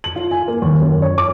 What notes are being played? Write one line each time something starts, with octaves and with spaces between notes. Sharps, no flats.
F#7
F4
G#5
A#3
D#2
F#2
C#5
D6